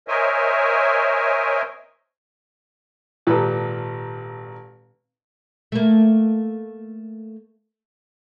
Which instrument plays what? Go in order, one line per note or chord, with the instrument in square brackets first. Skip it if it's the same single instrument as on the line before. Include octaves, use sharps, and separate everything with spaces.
[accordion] A#4 C5 C#5 D#5 E5 G#5
[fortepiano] G#1 A#2 G4 A4 B4
[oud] A3 A#3